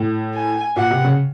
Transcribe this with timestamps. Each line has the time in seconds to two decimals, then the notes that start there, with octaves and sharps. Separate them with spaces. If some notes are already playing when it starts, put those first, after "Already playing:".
Already playing: A2
0.34 G#5
0.76 A#2 F#5
0.91 C3
1.04 C#3